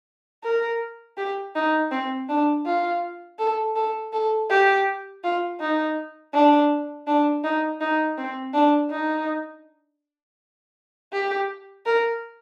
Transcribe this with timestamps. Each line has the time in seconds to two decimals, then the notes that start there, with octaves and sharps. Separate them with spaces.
0.44 A#4
1.17 G4
1.55 D#4
1.91 C4
2.29 D4
2.66 F4
3.39 A4
3.76 A4
4.13 A4
4.50 G4
5.23 F4
5.60 D#4
6.34 D4
7.07 D4
7.44 D#4
7.81 D#4
8.18 C4
8.54 D4
8.91 D#4
11.13 G4
11.86 A#4